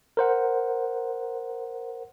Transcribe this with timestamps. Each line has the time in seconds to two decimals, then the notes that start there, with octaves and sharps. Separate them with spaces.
0.17 A#4 C5 F#5